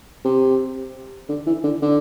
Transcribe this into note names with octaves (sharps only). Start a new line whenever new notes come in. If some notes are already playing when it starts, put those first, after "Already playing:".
C3
D3
E3
D3
D3